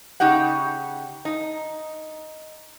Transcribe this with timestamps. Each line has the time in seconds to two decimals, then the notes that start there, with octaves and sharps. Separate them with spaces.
0.20 C#3 D#4 G4 F#5
1.25 D#4